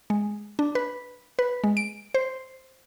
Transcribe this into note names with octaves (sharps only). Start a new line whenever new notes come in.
G#3
D4
B4
B4
G#3
D7
C5